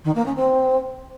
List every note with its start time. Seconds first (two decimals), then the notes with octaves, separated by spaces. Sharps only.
0.04 D#3
0.14 A#3
0.25 C#4
0.35 C4